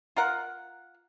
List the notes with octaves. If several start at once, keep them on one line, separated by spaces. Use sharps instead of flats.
F4 A#4 F#5